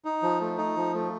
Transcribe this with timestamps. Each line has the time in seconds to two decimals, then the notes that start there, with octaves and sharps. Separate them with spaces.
0.05 D#4
0.23 F3
0.41 A3
0.58 D#4
0.77 F3
0.94 A3